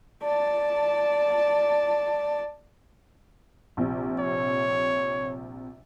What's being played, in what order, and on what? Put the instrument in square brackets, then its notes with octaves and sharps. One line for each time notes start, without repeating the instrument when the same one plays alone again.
[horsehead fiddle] D5 A5
[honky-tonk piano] A#1 C3
[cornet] C#5